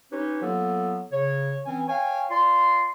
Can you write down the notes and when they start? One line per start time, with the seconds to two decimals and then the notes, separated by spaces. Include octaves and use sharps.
0.13 C#4 D#4 G4 B4 C#5
0.42 F#3 A#3 B3 F4 A4
1.12 C#3 C#5
1.66 E3 C4 C#4 G#5
1.89 C#5 F5 G5 G#5
2.31 F4 D5 C6